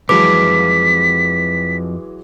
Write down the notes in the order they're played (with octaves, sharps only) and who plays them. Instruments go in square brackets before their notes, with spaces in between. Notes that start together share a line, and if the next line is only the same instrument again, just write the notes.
[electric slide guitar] F2 A5 [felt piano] E3 F#3 G#3 [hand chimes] B4 D6 [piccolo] B6